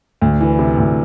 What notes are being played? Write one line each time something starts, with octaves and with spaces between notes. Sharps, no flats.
D2
E3
C3
D2